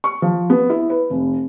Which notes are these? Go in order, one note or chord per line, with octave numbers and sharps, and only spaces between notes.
C#6
F3
B3
E4
B4
F1